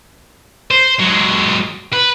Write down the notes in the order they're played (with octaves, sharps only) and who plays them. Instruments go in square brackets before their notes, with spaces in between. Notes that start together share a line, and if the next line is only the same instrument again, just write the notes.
[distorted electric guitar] C5
F#3 G#3
B4